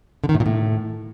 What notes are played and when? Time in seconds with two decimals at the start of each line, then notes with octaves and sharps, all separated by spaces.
0.24 D3
0.29 D#3
0.35 A2
0.40 A#2
0.46 A2